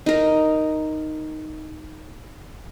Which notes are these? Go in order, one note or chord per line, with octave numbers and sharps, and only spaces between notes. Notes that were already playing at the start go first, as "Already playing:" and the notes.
D#4 A#4